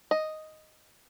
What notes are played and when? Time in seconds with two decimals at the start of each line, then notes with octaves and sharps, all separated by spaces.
0.11 D#5